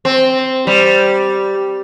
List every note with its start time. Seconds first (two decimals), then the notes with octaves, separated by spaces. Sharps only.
0.05 C4
0.67 G3